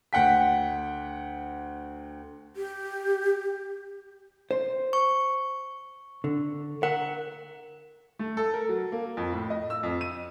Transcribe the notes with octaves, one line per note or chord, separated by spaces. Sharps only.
D2 F#5 G5 B6
G4
C5
C#6
D3
A#4 F#5
A3
A4
A#4
F#3
A#3
F2
A2
D#5
E6
F2
D#7